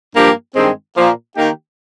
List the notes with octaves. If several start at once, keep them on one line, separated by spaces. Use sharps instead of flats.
G2 F3 A#3 D4 G4
G2 D#3 G#3 C4
A#2 F3 A#3
D#3 A#3 D#4 G4